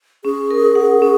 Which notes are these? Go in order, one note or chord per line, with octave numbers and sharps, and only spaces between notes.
C#4 G#4
A#4
F#5
C#4